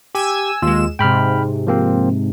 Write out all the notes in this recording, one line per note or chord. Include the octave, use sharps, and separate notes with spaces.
G4 G#5 E6
D#2 G#3 F4 E6 E7
G#2 C3 G5 B5 F6
F3 A#3 C4